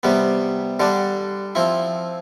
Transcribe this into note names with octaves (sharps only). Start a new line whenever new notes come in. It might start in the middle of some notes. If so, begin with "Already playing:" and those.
C3 G3 B3
D3 G3 D4
F3 C4 E4